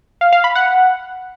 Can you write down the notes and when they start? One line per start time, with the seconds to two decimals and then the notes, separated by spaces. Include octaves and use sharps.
0.21 F5
0.33 F5
0.44 B5
0.55 F#5